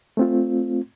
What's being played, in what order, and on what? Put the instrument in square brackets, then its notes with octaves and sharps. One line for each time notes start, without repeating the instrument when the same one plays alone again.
[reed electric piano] A3 C4 F4